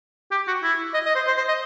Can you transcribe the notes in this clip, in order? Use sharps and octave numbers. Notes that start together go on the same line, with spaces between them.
G4
F#4
E4
D#5
D#5
C5
C5
C5
D#5